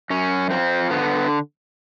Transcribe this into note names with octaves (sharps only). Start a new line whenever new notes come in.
F#2 C#4
F3 C4
D3 B3